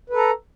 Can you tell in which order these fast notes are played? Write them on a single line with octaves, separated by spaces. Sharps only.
B4 A4 A#5